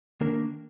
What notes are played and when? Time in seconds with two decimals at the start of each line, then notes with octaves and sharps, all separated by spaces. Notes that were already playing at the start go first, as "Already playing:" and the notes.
0.21 D#3 A#3 D4 A#4